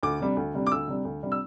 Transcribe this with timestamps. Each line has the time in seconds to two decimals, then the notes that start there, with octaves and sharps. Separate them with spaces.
0.03 D2 D6
0.20 C3 G3 D4
0.37 D2
0.54 C3 G3 D4
0.66 D6
0.72 D2 E6
0.88 C3 G3 D4
1.05 D2
1.23 C3 G3 D4
1.32 E6